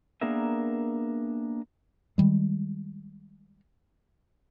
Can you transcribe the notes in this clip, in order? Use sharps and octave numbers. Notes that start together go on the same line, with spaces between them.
A#3 B3 D4 G#4 A#4 E5
D#3 G3 G#3